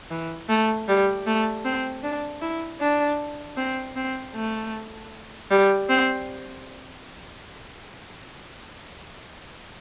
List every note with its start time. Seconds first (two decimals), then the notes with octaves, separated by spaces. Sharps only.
0.11 E3
0.49 A3
0.88 G3
1.26 A3
1.65 C4
2.03 D4
2.42 E4
2.80 D4
3.57 C4
3.96 C4
4.35 A3
5.51 G3
5.89 C4